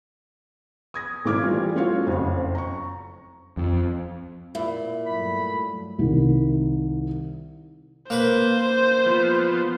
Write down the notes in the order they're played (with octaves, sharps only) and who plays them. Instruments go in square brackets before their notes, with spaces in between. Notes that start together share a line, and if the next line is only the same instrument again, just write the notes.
[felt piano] D#6 G#6 A#6
G#1 A3 E4 D6 F6 G#6
E3 G3 F4
A3 C#4 F4 F#4 C#5 F5
F#1 F2
A#5 C#6
[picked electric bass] F2
[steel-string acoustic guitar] A#2 [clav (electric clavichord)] E4
[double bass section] G2 F#3 A3 [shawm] B5
[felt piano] C2 D#3
[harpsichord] A#3 B4 B5 [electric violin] C5
[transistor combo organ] F3 B3 F4